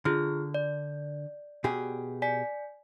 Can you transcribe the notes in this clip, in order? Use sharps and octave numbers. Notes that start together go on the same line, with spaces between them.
D3 F4 G#4 F6
D5
B2 G4 G#4
D5 G#5 B6